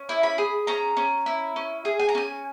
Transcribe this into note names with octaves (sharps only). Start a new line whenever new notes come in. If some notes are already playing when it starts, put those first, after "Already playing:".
Already playing: C#4
E4
B5
G#4
C#4 A#5
C#4
E4
C#4
G#4
G#5
A#5
C#4 G#5